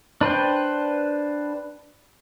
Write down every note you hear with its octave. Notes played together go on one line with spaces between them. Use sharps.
D4 B4 C5 G5